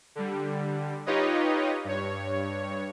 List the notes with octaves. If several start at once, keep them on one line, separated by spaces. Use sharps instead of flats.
D3 G3
D#4 F4 G4 B4 C#5 D#5
G2 C#5